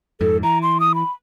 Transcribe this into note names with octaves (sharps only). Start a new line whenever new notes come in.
F2 G#2 A4
E3 A#5
C6
D#6
B5